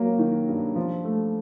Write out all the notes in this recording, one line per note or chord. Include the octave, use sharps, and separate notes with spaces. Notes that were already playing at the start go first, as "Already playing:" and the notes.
Already playing: F#3 A#3
D#3
G2
F3
A3